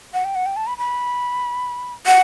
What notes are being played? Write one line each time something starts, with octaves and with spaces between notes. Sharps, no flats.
F#5
G5
F#5
G5
A5
B5
B5
F#5